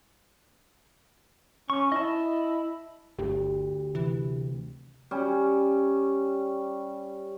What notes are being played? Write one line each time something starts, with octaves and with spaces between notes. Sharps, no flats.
C#4 C#6
E4 D#5 A5
G1 D2 G4
C3 E3
G3 C#4